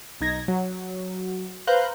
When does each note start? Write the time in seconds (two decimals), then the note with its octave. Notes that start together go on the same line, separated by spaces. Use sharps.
0.21 B1 D#4 G#6 A#6
0.48 F#3
1.67 B4 C5 F5 A#5 F#6 G6